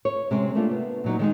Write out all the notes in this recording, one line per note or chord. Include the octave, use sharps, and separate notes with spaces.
C#5
C3 G#3 C4 C#4
A3 A#3 D4 F4
B3
A#2 F#3 D#4
D#3 G#3 D#4